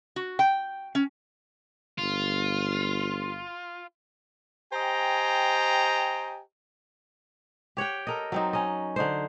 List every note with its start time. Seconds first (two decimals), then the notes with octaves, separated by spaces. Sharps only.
0.16 F#4
0.39 G5
0.95 C#4
1.98 G1 F4
4.72 G4 C5 D#5 G5 G#5 A#5
7.77 G4 C#5 F#5 G5
8.07 A4 A#4 D#5
8.32 F#3 C4 D#4
8.53 C#4 D#5
8.96 D3 D#4 C5